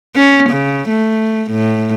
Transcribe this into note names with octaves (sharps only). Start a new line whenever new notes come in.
C#4
C#3
A3
A2